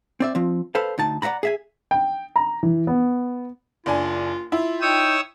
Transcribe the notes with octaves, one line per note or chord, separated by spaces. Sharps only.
C4 D5 E5
F3 C4
A4 B4 C5 F5
D2 D#4 A5
D5 E5 F#5 A#5 B5
G#4 E5 G#5
G5
A#5
E3
B3
F#1 D4 F4 G#5
E4 F4
D#4 C#5 G5 D#6 E6